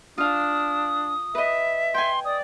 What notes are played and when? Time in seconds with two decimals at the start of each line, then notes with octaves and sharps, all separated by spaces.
0.18 D4 F4 F5 D#6
1.35 B4 D#5 E5
1.94 G5 G#5 C6
2.25 D5 D#6